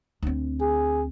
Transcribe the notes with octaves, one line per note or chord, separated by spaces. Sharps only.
D2 C4
G#4